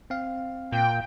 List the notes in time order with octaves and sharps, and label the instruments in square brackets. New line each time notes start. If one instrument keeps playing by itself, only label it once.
[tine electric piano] C4 F5
[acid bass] A#2 [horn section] G5